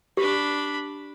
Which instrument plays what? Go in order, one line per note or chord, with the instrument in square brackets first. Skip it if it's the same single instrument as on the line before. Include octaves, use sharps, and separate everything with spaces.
[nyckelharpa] D4 B5 [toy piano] G4